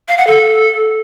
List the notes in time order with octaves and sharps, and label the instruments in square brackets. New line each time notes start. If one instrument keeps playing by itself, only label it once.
[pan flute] F5
F#5
A4